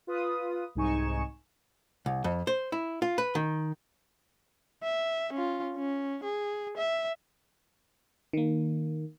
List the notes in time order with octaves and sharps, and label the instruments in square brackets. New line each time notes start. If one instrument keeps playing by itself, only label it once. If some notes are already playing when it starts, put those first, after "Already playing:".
[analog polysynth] F4 B4 D#6
C2 G#2 D#4 G#5 C#6 E7
[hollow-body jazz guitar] C2
F2
C5
E4
F4
B4
D#3
[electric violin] E5
C#4 F4
C#4
G#4
E5
[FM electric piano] D#3 A#3